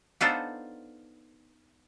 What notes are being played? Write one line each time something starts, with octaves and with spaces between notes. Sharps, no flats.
B3 D4 D#4 F4 A4 C5